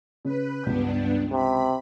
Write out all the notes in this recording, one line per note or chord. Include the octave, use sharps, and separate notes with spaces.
C#3 B4
C#2 G2 B3 D4 G6
C3 B5